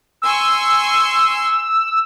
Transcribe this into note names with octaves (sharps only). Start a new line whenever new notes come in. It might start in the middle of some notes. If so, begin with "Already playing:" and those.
G#5 C6 C#6 E6